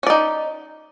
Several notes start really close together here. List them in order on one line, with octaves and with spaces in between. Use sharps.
C#4 D5 D#4